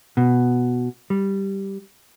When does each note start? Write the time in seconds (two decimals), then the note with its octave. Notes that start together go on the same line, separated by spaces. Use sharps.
0.17 B2
1.10 G3